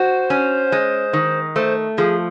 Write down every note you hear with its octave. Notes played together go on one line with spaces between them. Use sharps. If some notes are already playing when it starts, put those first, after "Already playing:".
Already playing: F#4 C5
C#4
G#3
D#3
A3 C5
F3 G#4